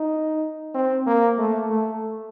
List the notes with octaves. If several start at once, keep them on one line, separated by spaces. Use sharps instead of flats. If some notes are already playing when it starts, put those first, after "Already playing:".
Already playing: D#4
C4
A#3
A3
A3